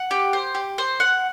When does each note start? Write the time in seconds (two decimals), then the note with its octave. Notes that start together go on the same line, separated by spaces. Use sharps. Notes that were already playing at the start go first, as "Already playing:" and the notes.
Already playing: F#5
0.11 G4
0.33 C5
0.55 G4
0.78 C5
1.00 F#5